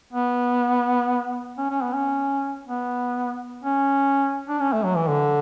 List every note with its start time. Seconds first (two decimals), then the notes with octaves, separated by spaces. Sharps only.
0.13 B3
1.58 C#4
1.70 C#4
1.83 B3
1.94 C#4
2.67 B3
3.64 C#4
4.48 D4
4.60 C#4
4.73 A3
4.84 F#3
4.96 E3
5.09 D3